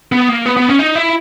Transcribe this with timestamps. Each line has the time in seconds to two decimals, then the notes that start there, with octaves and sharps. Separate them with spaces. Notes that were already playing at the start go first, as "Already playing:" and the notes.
0.12 B3
0.29 A#3
0.46 B3
0.57 B3
0.68 C#4
0.79 D#4
0.96 E4